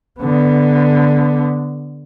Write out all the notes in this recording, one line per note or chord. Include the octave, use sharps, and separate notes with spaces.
D3 B3